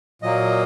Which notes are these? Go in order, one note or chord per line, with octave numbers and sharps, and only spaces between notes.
A#2 F#3 A#3 D#5